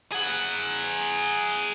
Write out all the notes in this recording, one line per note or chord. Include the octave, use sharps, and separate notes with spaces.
G#4 F#5